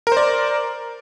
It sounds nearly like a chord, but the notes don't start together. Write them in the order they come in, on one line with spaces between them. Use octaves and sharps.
A#4 C5 D5